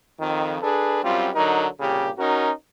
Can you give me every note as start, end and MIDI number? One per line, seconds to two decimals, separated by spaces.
0.20 0.58 41
0.20 0.58 51
0.62 1.03 62
0.62 1.03 68
0.62 1.03 69
0.62 1.03 71
1.03 1.30 42
1.03 1.30 55
1.03 1.30 60
1.03 1.30 65
1.35 1.67 50
1.35 1.67 54
1.35 1.67 63
1.35 1.67 70
1.80 2.11 36
1.80 2.11 46
1.80 2.11 49
1.80 2.11 67
2.18 2.50 61
2.18 2.50 63
2.18 2.50 66
2.18 2.50 70